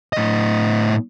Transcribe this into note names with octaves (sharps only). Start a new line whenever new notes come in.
A2 D#5